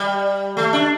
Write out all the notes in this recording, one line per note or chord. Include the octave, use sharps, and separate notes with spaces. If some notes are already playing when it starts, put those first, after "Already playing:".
Already playing: G3
A3
D4